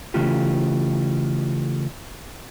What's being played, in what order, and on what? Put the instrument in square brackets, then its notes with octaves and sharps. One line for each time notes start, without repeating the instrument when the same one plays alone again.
[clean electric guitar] C#3 E3 A3 F4 G4